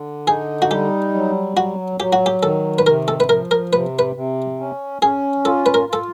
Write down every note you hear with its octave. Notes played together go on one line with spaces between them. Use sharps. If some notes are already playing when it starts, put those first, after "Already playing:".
Already playing: D3
D#4 G#4
F#4
G3 G4
F#3
F#3 F#4
F#3 G4
F#4
G4
D#3 A4
B4
C3 A#4
A4
B4
F3 A#4
A#4
C3 B4
B4
C3
C#4
C#4 G#4
F4 A4
B4
A#4
F4 A4